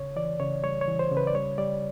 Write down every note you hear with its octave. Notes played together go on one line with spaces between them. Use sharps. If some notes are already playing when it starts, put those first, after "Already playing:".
Already playing: C#3 C#5
E3 D5
C#3 C#5
G3 C#5
C#5
E3
C5
C#3
B4
D5
G3 C#5
G3 D5